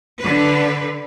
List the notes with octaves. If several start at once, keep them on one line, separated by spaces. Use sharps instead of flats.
D3 B4